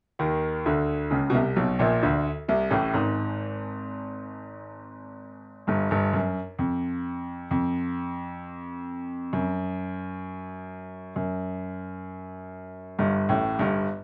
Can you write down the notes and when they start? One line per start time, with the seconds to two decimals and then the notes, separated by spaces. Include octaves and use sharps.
0.19 D#2 D#3
0.66 D2 D3
1.11 C#2 C#3
1.30 B2
1.35 C2 C3
1.56 B1 B2
1.79 A#1 A#2
2.03 D2 D3
2.48 C2 C3
2.71 A1 A2
2.94 G#1 G#2
5.67 G1 G2
5.91 G1 G2
6.13 F#2
6.59 F2
7.51 F2
9.33 F#2
11.16 F#2
12.99 G1 G2
13.29 A1 A2
13.59 G1 G2